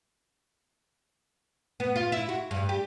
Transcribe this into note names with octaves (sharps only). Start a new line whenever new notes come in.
B3
F4
E4
F#4
G2
G4